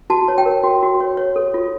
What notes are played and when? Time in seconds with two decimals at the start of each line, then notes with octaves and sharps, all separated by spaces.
0.10 F#4 A5
0.28 C#5
0.38 G5
0.46 A#4
0.63 F#4
0.83 F#4
1.00 C#5
1.17 C#5
1.36 A4
1.54 F4